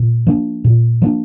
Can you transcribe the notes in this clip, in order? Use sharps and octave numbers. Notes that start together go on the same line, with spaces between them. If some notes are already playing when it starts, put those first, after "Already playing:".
Already playing: A#2
F3 A#3 D4
A#2
F3 A#3 D4